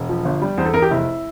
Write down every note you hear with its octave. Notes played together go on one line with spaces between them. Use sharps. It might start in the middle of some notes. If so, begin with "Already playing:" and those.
Already playing: E1
F3
G1
G3
E2 C5
A4
E2 A#4
G4
F1 E4